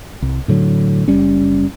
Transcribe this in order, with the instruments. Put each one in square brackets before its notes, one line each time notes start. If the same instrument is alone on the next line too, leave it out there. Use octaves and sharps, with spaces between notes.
[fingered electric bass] C2
A2 D3 F#3
F#1 G3 C#4